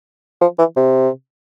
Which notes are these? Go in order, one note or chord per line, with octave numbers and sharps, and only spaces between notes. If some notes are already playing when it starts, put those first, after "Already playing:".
F3
E3
C3